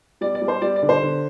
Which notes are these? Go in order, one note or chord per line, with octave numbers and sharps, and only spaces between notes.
G3 D5
D5
G3
C5
G3 D5
D5
D3
C5
D3